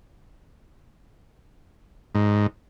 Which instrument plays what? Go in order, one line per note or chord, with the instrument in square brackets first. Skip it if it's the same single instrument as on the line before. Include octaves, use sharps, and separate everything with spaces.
[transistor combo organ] G#2